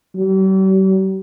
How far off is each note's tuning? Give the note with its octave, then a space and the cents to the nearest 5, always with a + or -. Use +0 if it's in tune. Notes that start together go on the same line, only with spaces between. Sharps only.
G3 -45